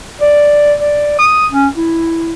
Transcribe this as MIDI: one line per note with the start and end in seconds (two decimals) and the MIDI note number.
0.21 0.73 74
0.80 1.18 74
1.19 1.47 87
1.52 1.68 61
1.77 2.33 64